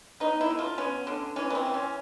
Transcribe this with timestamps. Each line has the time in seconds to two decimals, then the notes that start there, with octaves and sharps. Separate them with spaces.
0.20 B3 D#4
0.41 E4
0.50 D3
0.59 F4
0.78 B3 C#4
1.07 D3
1.36 E3 C#4
1.50 B3
1.55 C4
1.66 E3
1.74 C#4